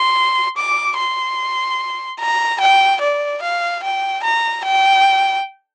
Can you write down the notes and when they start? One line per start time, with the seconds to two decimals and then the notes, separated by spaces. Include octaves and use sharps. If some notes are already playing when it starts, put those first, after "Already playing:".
Already playing: C6
0.57 D6
0.97 C6
2.20 A#5
2.60 G5
3.01 D5
3.42 F5
3.83 G5
4.23 A#5
4.65 G5